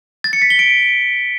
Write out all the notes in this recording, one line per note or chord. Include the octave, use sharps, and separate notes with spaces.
A6
C#7
B6
G7
D7